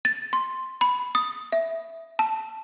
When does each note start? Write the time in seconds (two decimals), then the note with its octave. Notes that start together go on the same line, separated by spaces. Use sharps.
0.05 A6
0.33 C6
0.81 B5
1.15 D#6
1.52 E5
2.19 A5